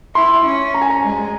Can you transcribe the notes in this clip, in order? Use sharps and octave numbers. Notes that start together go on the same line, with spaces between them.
E4 C6
C#4
A#5
G#5
A#5
G#3